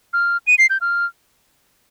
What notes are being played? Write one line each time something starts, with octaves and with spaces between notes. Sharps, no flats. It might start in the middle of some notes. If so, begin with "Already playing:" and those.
F6
D#7
C7
G6
F6